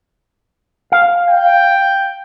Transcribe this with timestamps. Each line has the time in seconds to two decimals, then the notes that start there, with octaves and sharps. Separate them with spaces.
0.92 F5
1.27 G5